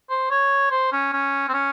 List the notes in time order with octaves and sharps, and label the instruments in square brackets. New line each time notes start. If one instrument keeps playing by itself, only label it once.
[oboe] C5
C#5
C5
C#4
C#4
C4
C#4